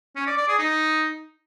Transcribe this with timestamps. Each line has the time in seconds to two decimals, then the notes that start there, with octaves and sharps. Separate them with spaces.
0.16 C#4
0.27 D5
0.37 D5
0.48 G#4
0.59 D#4